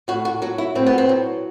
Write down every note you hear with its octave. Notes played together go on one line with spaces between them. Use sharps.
A2 F#4
F#4
F#3 F#4
E4
A2 C4
B3
C4
F#3